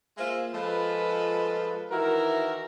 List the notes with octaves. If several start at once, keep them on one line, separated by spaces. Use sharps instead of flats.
G#3 A#3 F4 C5 E5
F3 G#3 F4 A4 B4
D#3 E3 E4 F#4 A#4